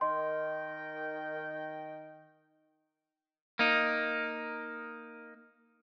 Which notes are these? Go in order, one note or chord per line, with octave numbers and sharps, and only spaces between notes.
D#3 A#4 D#5 G5 C6
A#3 D#4